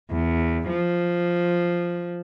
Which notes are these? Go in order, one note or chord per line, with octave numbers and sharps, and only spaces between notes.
E2
F3